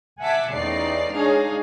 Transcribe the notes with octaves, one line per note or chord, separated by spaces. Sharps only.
E5 F#5 G#5 A5 D6 B6
A1 E2 D#4 D5 C7
G#3 D4 D#4 G#4 C#5 F5